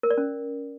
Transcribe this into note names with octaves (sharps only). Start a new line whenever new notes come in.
A#4
D5
C#4